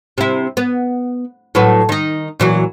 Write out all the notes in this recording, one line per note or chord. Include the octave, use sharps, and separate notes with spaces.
C3 E4
B3
A2 F#3 B4
D#3 D#4
A#2 E3 F#3